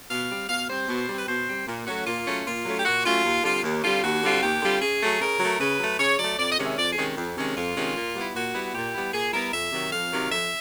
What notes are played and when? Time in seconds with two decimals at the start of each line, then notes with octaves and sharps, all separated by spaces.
0.10 B2 F5
0.30 G3 C4
0.49 B2 F5
0.69 G3 C4 C5
0.88 B2
1.09 G3 C4
1.18 B4
1.28 B2 C5
1.47 G3 C4
1.67 A#2
1.86 F#3 A3 C#4 F#4
2.06 A#2 F4
2.27 F#3 A3 C#4
2.46 A#2 F4
2.65 F#3 A3 C#4
2.79 G4
2.85 A#2 F#4
3.05 F#3 A3 C#4 F4
3.24 D#2
3.44 D3 G3 C4 F4
3.63 D#2
3.83 D3 G3 C4 F4
4.03 D#2 F#4
4.23 D3 G3 C4 F4
4.42 D#2 G4
4.62 D3 G3 C4 F4
4.81 C#3 G#4
5.01 F#3 A3
5.20 C#3 A#4
5.40 F#3 A3
5.59 C#3 B4
5.80 F#3 A3
5.99 C#3 C#5
6.19 F#3 A3 D5
6.38 F2 D5
6.51 D#5
6.58 C3 D#3 G#3 C#4
6.65 E5
6.78 F2 D5
6.91 G#4
6.97 C3 D#3 G#3 C#4
7.17 F2
7.36 C3 D#3 G#3 C#4
7.56 F2 F4
7.76 C3 D#3 G#3 C#4
7.96 A#2
8.15 G3 B3 E4
8.34 A#2 F#4
8.54 G3 B3 E4
8.74 A#2 G4
8.94 G3 B3 E4
9.13 A#2 G#4
9.33 G3 B3 E4 A#4
9.53 F2 E5
9.72 C3 D#3 F#3
9.91 F2 F5
10.12 C3 D#3 F#3
10.31 F2 E5